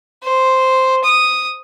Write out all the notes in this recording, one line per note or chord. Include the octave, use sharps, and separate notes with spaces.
C5
D#6